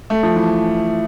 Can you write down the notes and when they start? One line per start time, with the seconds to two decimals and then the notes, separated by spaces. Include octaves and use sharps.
0.10 A3
0.23 F3
0.36 E3